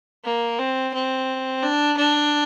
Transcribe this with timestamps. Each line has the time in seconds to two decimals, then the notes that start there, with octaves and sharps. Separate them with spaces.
0.25 A#3
0.59 C4
0.94 C4
1.63 D4
1.98 D4